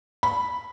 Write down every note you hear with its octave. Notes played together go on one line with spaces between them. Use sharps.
B5